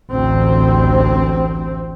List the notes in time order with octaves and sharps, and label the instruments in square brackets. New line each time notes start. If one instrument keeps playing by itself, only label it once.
[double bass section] A1 D2 C4